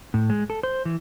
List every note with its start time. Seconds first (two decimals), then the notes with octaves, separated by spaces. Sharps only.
0.14 A2
0.30 G#3
0.50 A4
0.63 C5
0.85 E3